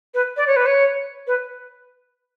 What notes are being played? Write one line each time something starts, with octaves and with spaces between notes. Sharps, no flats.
B4
D5
C#5
B4
C#5
B4